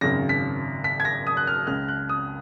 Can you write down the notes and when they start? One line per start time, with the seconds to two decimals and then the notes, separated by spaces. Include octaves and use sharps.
0.01 G#1 F#2 C#3 A#6
0.29 B6
0.84 B6
1.00 G#6
1.05 A#6
1.27 D#6
1.37 F#6
1.47 F6
1.67 C#2 C#3 F6
1.88 F#6
2.09 D#6